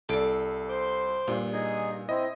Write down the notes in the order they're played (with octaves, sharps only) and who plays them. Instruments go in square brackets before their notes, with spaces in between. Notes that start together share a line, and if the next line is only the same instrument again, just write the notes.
[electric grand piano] C2 D7 [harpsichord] A4 D5
[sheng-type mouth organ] C5 C6 D6
[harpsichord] G2 [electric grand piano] A#2
[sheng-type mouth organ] D#4 G#4 G#5
[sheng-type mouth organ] C4 E4 [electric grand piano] D#5